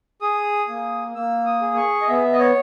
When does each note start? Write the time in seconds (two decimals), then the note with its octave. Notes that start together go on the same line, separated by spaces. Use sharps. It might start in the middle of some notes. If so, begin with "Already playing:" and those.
0.21 G#4 D#6
0.68 A#3
1.15 A#3 E6
1.46 D#6
1.61 G#4
1.77 C#6
2.02 D#5
2.08 B3 E5
2.33 D#5
2.39 C#5